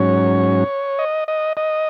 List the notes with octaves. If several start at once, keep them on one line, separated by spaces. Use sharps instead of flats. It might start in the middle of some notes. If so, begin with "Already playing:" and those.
Already playing: G#2 F#3 C#4 C#5
D#5
D#5
D#5